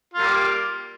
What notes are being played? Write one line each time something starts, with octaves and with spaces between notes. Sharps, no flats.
G3 A#3 F4